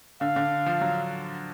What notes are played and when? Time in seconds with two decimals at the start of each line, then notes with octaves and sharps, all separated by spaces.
0.21 D3 F5
0.36 D3
0.66 F3
0.81 F#3